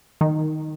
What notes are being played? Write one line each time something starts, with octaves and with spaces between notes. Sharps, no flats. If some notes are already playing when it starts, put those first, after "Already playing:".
D#3